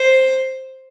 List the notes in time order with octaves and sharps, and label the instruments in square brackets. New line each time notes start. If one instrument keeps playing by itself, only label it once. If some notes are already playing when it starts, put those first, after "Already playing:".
Already playing: [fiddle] C5